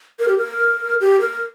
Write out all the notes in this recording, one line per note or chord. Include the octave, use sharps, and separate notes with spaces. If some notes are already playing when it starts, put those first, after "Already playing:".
A#4
G4
A#4
G4
A#4